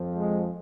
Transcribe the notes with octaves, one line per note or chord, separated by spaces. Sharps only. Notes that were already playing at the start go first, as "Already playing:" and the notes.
Already playing: F2 F3
G#3